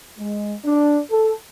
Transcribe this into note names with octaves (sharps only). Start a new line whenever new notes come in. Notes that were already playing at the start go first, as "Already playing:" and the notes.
G#3
D4
A4